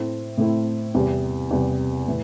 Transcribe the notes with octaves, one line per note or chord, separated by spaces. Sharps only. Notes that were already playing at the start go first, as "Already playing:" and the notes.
Already playing: A2 A3 C4 E4
A2 A3 C4 E4
E2 C3 G3
E2 C3 G3
A2 E3